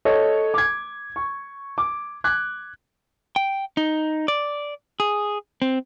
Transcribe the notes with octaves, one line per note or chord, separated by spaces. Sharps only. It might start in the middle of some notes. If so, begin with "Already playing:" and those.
A4 C#5 D#5
D6 G#6
C#6
D6
D6 F#6 G#6
G5
D#4
D5
G#4
C4